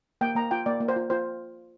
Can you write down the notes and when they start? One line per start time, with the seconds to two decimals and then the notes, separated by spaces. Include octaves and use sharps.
0.21 A#3 G5
0.35 A#3 A#5
0.51 F4 G5
0.66 A#3 D5
0.80 A#3
0.88 C5
0.96 F4
1.10 F4 C5